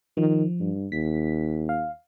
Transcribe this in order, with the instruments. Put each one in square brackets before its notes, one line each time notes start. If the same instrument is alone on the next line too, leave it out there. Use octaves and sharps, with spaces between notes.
[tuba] D#3 [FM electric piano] F3
[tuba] G2
[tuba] D#2 [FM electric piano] B6
[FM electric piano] F5